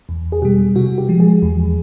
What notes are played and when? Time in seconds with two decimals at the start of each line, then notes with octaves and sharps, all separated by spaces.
0.09 E2
0.32 G#4
0.42 B2 G3 G4
0.75 C3 F#4
0.98 G4
1.09 F3 G#3
1.20 G#4
1.42 E2